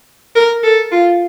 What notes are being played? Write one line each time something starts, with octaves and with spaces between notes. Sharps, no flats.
A#4
A4
F4